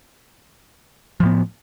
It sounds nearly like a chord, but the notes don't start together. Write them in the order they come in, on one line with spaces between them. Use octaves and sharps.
F3 A2 B3